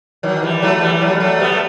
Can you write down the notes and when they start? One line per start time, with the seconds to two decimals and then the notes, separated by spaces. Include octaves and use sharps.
0.23 D#3 F#3
0.42 E3 G3
0.62 F#3 A3
0.78 A3
0.81 E3 G3
1.01 F#3 A3
1.15 G3
1.20 F#3 A3
1.40 G3 B3
1.52 A3